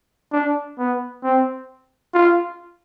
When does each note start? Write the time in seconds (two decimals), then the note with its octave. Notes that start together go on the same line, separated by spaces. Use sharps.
0.32 D4
0.78 B3
1.24 C4
2.14 F4